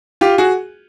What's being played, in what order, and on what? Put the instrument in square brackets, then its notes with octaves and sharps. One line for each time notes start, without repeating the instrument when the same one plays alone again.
[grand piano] F4 G4
F#4 G#4